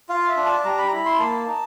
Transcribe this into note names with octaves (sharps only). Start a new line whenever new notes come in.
F4 F5
E5
D4
A5
G3 A#5
B5
A#5
E4 B5
C6
A#3 A5
D#4